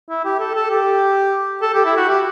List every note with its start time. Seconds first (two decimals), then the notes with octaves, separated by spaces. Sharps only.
0.09 E4
0.25 G4
0.40 A4
0.55 A4
0.70 G4
1.62 A4
1.74 G4
1.85 E4
1.97 F#4
2.09 G4